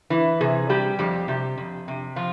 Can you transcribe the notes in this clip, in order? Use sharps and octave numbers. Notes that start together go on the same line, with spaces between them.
E3
C3 G#4
G3 G4
F2 G4
C3 G4
F2
C3
F3 F4